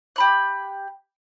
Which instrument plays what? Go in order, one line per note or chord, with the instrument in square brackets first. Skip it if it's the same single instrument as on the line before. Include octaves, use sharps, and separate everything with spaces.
[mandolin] G4 B5 F#6